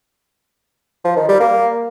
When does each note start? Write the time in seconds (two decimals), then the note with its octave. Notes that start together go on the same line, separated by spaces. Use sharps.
1.05 F3
1.17 D#3
1.28 G3
1.40 A#3